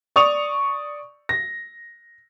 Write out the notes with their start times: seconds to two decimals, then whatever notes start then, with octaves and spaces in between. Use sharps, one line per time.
0.16 D5 C#6 D#6 F7
1.29 A#6